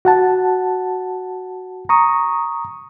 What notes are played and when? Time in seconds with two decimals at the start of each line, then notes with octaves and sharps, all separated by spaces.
0.05 F#4 F#5 A5
1.89 A#5 C#6 D#6